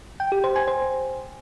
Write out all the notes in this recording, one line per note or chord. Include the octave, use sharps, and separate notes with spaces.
G5
G4
C5
G#5
C5